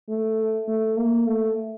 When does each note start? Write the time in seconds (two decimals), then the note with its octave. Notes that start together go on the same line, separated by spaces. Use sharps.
0.08 A3
0.68 A3
0.97 A#3
1.27 A3